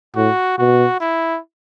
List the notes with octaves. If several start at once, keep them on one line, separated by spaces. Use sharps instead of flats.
A2 F#4
B2 F#4
E4